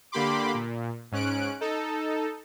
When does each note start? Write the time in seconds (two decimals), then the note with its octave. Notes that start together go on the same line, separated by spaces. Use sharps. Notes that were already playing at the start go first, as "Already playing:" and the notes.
0.12 D3 A#3 G4 B5 C6 D6
0.54 A#2
1.12 G#2 C#4 F#6 D7
1.61 D#4 A4